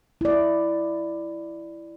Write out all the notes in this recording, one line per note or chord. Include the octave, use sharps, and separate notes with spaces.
E4 D5